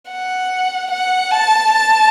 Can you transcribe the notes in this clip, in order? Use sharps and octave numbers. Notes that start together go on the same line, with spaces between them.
F#5
F#5
A5
A5